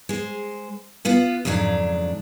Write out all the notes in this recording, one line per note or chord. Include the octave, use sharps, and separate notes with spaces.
G#3 C5
B3 F4 F#5
F2 G#2 C#3 F#3 D4